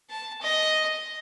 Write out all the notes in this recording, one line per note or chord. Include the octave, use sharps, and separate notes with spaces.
A5
D#5